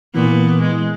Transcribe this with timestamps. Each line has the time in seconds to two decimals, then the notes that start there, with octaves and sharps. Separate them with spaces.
0.15 A#2 E3 B3
0.61 G#3